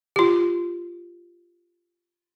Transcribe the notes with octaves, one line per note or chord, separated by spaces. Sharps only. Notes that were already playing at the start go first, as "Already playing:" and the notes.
F4 G4